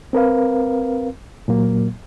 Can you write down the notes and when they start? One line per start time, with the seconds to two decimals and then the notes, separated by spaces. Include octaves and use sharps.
0.13 C4 A#4 B4 F5
1.48 A#2 F#3 A#3